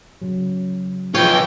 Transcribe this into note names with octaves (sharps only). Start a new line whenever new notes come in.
C#3 F#3
E3 F3 F4 B4 C#5 G5